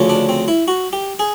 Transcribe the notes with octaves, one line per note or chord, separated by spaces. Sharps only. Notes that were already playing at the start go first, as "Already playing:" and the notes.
Already playing: D2 C#3 F3
D4
C4
E4
F#4
G4
G#4